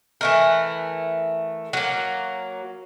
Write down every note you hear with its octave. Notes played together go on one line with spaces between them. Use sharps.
E3 A3 A#4
F#3 A#3